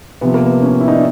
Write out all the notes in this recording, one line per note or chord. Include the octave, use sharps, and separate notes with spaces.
C3 F3 B3
A#3
B3
C#4
E4
D#4
D4